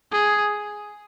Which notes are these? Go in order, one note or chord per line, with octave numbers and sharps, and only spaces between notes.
G#4